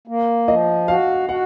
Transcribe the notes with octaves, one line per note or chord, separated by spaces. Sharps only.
A#3
F3 D#5
F#4 F5
F#4 F#5